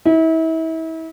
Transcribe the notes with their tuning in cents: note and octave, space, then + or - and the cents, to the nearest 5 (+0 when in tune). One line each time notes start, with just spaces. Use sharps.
E4 -35